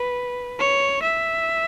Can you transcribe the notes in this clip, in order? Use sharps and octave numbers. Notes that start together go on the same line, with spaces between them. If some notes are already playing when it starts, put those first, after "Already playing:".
Already playing: B4
C#5
E5